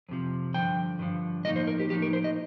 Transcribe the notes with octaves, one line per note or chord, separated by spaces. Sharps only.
F2 C3 F3
G2 D3 F3 G5
G2 D3 F3
A2 F3 A#3 D#4 D#5
C5
A#4
G4
A2 F3 A#3 D#4 G4
A#4
C5
D#5